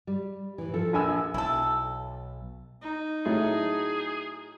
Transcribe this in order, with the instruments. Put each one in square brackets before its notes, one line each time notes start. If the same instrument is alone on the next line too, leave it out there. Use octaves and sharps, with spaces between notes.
[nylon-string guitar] G3
A2 E3
[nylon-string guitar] F3 [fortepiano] A4
[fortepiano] A#1 G#5 E6
[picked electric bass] B1 [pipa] E4 A4
[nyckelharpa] D#4
[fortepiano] A2 F#3 A3 [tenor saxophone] G#4